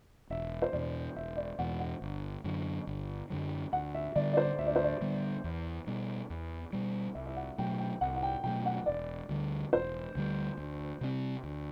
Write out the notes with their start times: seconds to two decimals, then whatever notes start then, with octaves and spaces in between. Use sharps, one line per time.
0.30 E1 E5
0.62 C5
0.73 E2 B2 D5
1.16 E1 E5
1.37 D5
1.59 E2 B2 F#5
1.80 F#5
2.02 G1
2.44 F#2 D3 F#3
2.87 G1
3.30 F#2 D3 F#3
3.73 D2 F#5
3.95 E5
4.16 D3 G3 B3 D5
4.33 D5
4.37 C5
4.59 D2 E5
4.67 D5
4.76 C5
4.84 D5
5.01 D3 G3 B3
5.44 E2
5.87 B2 G3
6.30 E2
6.73 B2 G3
7.15 C2 E5
7.27 E5
7.37 F#5
7.58 B2 F#3 A3 G5
7.79 G5
8.01 C2 F#5
8.16 F#5
8.23 G5
8.44 B2 F#3 A3 G5
8.66 F#5
8.86 E1 D5
9.29 D2 D3 G3
9.72 E1 C5
10.15 D2 D3 G3
10.58 D2
11.01 C3 G3 C4
11.44 D2